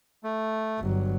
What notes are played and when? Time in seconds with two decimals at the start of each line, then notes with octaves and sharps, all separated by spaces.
0.23 A3
0.80 G1 F#3